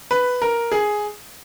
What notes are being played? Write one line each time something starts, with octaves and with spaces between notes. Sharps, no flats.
B4
A#4
G#4